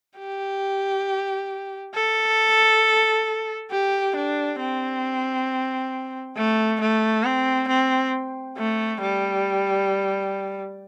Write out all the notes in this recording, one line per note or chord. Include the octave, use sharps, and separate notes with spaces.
G4
A4
G4
D4
C4
A3
A3
C4
C4
A3
G3